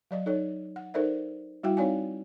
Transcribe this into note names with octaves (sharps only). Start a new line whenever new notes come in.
F#3 D5 D#5
D#4 A4 C#5
F#5
D#4 A4 A#4 C5 D5 E5
G3 E4 F#4 E5 G5
C4 D#4 C#5 D5 F5 G#5